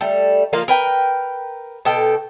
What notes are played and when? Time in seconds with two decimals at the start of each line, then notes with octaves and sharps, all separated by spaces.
0.01 G3 A3
0.53 F3 A#3 F4 F5
0.68 A#4 B4 G5
1.85 B2 A4 G5